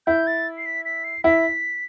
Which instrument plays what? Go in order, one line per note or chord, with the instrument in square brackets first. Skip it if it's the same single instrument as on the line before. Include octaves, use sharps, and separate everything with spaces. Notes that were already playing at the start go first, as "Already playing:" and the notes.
[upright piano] E4 [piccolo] G6
[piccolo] A6
C7
B6
B6
C7
[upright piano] E4 [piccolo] B6